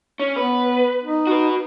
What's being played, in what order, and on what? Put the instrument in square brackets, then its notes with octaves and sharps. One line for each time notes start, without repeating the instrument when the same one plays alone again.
[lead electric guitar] C#4
[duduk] B3 [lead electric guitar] B4
[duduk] D#4
[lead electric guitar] F#4 B4